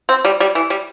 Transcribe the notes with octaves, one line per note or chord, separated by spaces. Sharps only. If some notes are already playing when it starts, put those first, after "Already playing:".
C4
G3
G3
E3
G3